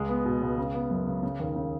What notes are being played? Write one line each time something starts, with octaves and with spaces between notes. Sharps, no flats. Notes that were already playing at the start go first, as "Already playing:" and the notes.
Already playing: C#2 G#3
B3
B2
C#2
C#3
B3
F#2
C#3
C#3
D#2
C#3